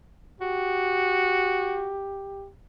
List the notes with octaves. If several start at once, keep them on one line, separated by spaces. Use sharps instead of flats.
F#4 G4